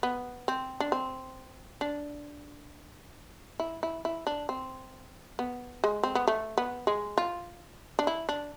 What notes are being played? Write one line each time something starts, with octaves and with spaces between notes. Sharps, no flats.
B3
C4
D4
C4
D4
E4
E4
E4
D4
C4
B3
G#3
C4
B3
A3
B3
G#3
F4
D4
E4
D4